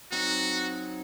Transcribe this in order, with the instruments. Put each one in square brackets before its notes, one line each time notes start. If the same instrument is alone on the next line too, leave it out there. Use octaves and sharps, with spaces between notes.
[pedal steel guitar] F#3 C4 D#4 [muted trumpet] F#4